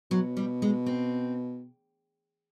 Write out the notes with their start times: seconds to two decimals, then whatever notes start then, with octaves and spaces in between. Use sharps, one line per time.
0.11 B2 F#3
0.37 G3
0.62 G#3
0.86 C4